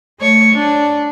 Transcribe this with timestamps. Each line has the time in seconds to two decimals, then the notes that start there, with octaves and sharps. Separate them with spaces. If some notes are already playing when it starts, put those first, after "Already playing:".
0.19 A3 C#5
0.53 D4